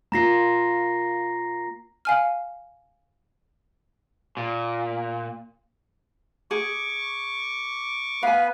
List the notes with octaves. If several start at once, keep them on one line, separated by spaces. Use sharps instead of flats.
A#3 F4 A#5 A#6 C7
F5 G#5 F6
A#2
G#4 C#6 D6
B3 B4 F5 G#5